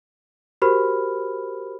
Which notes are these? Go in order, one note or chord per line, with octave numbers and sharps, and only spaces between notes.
F#4 G4 A#4 C5 B5 F6